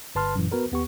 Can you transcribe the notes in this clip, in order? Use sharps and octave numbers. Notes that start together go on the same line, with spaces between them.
G1 B4 A5 C6 F6
F#2 A#2 E3
B3 F#4 A#4 B4
D#2 B3 G4 C#6